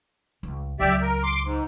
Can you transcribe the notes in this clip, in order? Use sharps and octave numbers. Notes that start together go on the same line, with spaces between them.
C#2
C#2 F#3 G4 D5 E5
A#4
C6 D6
G#2